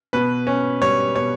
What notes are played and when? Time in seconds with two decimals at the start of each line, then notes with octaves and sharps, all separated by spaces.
0.13 B2 B4
0.47 C#4
0.82 G3 C#5
1.15 B2 C#5